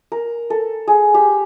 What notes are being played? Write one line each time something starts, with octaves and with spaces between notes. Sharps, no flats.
A#4
A4
G#4
G4